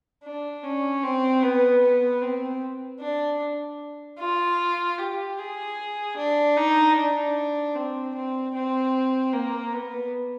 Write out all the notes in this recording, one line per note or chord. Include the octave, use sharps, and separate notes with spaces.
D4
C#4
C4
B3
B3
C4
D4
F4
G4
G#4
D4
D#4
D4
C4
C4
C4
A#3
B3